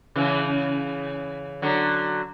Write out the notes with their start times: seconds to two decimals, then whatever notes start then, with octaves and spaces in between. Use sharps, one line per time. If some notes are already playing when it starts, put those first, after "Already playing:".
0.16 C#3 E3
1.62 D3 F#3